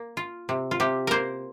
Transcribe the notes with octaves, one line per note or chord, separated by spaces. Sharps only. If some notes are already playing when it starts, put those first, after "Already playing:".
Already playing: A#3
F4
C3
F4
C3 G4
A#3 A#4 C5